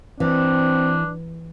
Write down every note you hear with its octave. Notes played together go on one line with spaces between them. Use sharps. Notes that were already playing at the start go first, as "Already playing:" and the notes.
E3 C4 D4